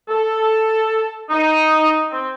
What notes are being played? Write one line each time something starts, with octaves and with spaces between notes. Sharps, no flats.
A4
D#4
C4